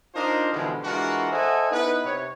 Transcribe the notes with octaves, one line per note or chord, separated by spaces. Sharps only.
D4 D#4 F4 A#4 C5
B2 D3 E3 F3 G3 G#3
E3 G#3 D4 F4 F#4 A#4
A4 C5 D#5 E5 F#5 G#5
B3 D#4 E4 B4
C3 C#5